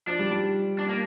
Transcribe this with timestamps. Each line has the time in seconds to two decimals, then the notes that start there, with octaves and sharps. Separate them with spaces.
0.07 F3 D4
0.19 G3
0.31 G3
0.79 D4
0.89 A#3